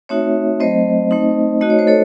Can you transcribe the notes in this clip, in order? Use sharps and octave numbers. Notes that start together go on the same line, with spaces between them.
A3 C4 D#4 F#4 C#5 E5
F#3 A3 C4 C5 D#5
A3 C4 D#4
A3 D#4 F#4 D#5
C#5
C5
A4 C#5